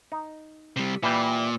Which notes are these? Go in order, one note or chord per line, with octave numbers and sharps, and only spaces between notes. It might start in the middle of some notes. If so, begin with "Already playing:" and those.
D#4
C3 G3
A#2 E3 G3